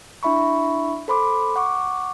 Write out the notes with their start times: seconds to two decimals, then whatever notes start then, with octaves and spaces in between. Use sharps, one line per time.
0.23 D4 E4 E5 B5 C#6
1.08 A4 C5 B5 C6 D6
1.56 F#5 C#6 D6